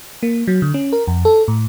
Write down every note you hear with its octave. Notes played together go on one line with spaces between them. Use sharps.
A#3
F#3
D3
C#4
A#4
F2
A4
A2